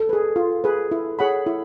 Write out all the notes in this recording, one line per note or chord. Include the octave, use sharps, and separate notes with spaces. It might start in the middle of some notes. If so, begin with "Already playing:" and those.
Already playing: A4
G#4 B4
F4
G#4 B4
E4
G#4 C#5 F#5 B5
E4